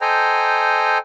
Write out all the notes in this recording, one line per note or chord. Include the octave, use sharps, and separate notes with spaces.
A4 C5 D#5 G5 G#5 A#5